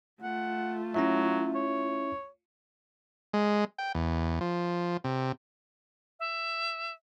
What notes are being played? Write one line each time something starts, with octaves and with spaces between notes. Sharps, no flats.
A3 F4 F#5
F#3 C#4 E4 E5
C#5
G#3
G5
E2
F3
C3
E5